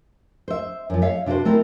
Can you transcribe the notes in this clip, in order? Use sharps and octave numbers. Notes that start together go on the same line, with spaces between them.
C5 E5
F#2 F3
C#5 E5 F5
C3 D4 F#4 B4 C5
A3 C4 E4 A#4